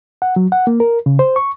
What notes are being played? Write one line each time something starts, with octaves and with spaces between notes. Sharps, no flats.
F#5
F#3
F#5
A#3
A#4
C#3
C5
C#6